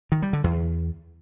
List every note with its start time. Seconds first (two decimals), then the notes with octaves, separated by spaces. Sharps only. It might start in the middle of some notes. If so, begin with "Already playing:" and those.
0.12 D#3
0.22 G3
0.33 D3
0.44 E2